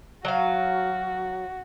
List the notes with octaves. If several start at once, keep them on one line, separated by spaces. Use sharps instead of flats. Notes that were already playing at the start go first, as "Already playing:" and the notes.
F#3 F#4 F5